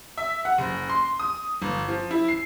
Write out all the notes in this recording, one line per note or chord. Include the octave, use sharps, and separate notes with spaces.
E5
F#5
F#1
C6
D#6
G1
F3
E4
C7